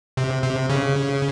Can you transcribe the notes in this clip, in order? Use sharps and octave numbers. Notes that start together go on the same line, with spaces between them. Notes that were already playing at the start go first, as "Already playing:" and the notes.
C3
C3
C#3